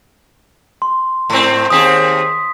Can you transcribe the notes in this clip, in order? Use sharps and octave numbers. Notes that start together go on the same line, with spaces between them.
C6
G#2 C4
D#2 C4 G#4 D#6 B6